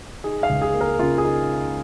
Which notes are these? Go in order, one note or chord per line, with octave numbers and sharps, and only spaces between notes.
D#4 G#4
F5
C#2
G#4
A#3
A#4
C#3 F4
G#4
D#4